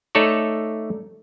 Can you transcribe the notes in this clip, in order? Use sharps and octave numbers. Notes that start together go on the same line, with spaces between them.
A3 D#4 A4 C#5 D5